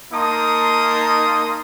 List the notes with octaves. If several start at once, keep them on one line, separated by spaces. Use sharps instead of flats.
A#3 D#4 A5 C6 D#6